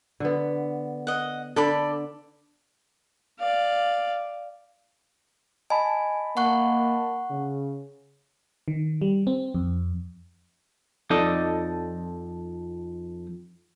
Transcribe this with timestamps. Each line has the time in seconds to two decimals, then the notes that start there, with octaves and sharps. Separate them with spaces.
0.20 D3 B3
1.07 D#5 F#5
1.56 D3 A4 D5 B5
3.39 D5 F5
5.70 D#5 G#5 A5 B5
6.37 A#3 F#5 C#6 F#6
7.30 C#3
8.68 D#3
9.01 G3
9.27 C4
9.55 F2
11.10 F2 D#4 A4 D5 D#5